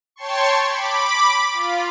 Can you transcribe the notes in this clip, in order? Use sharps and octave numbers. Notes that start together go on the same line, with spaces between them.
C#5 G5 A5 C6 C#6
B5 D6
F4